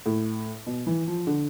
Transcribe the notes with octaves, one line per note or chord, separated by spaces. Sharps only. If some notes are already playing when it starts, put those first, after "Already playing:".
A2
B2
E3
F3
D3